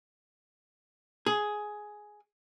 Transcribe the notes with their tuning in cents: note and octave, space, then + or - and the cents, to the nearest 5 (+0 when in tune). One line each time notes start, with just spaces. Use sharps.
G#4 +10